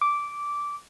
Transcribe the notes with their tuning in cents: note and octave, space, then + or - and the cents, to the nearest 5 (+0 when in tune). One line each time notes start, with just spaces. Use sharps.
D6 -10